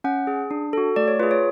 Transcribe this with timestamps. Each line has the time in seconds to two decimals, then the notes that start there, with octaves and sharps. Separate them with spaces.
0.04 C#4 F#5
0.27 G#4
0.51 D4
0.73 F#4 A4
0.96 A3 D5
1.08 C#5
1.19 F4 B4
1.23 G#4
1.31 C#5